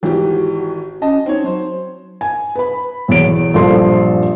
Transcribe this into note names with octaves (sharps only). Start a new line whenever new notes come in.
G#1 E3 F#4 G4
C#4 D#5 A5
C4 D#4 C#5
F#3 C5
G#5
B4 B5
B1 E2 C#5 D7
A#1 G2 F3 A4 C6